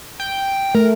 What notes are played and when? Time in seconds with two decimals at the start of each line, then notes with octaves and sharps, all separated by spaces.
0.20 G5
0.75 A3 A#4